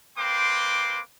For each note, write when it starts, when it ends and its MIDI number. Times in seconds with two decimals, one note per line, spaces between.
0.17 1.00 58
0.17 1.00 60
0.17 1.00 71
0.17 1.00 79
0.17 1.00 84
0.17 1.00 86